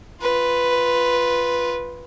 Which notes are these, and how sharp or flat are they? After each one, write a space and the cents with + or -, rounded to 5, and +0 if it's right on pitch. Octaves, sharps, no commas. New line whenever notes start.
F4 +0 B4 +0